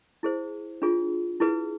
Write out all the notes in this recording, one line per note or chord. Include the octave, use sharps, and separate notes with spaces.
E4 G#4 C5
D4 F4 G#4
E4 G#4 B4